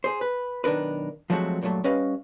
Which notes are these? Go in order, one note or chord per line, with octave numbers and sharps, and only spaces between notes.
G#4 C5
B4
B1 D#3 D4 A#4 B4
F3 F#3 G#3 A3 C4 F#4
G2 A#2 D#3 F#3 A3
G3 C#4 B4 D#5 F5